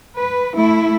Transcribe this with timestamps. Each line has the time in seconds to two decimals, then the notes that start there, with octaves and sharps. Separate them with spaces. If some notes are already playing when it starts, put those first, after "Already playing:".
0.18 B4
0.56 A3 E4